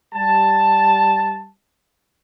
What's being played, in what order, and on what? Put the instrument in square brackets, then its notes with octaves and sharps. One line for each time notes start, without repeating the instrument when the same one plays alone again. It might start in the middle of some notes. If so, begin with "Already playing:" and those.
[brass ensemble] G3 A5